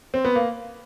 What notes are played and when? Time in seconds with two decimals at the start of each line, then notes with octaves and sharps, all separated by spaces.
0.14 C4
0.25 B3
0.35 A#3